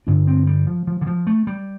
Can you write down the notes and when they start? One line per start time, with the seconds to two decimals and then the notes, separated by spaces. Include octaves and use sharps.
0.07 G2 D3 D4
0.27 C4
0.47 G3
0.67 F3
0.87 F3
1.01 D3
1.07 F3
1.27 A3
1.47 G3